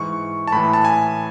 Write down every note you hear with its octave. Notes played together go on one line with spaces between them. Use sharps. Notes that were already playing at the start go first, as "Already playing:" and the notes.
Already playing: G#2 E3 C#6
A5
A2 E3 B5
A5
G#5